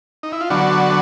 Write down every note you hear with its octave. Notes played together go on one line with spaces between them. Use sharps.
D#4
E4
F4
D3 F#3 B3 D4 F#4